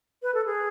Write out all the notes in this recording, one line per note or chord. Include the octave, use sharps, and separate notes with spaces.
B4
A4
G#4